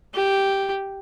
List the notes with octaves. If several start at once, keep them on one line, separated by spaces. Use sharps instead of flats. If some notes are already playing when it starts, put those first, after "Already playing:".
G4